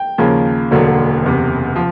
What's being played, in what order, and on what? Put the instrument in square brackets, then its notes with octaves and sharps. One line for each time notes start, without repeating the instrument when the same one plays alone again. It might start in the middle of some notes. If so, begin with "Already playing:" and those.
Already playing: [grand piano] G5
D#2 C#3 F3 A#3
E1 D2 D3 F#3 A#3
F#1 E2 C3
F3